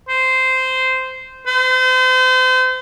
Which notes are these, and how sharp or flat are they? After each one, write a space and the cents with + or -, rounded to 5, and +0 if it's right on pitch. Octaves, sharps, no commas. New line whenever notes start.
C5 -10
C5 -35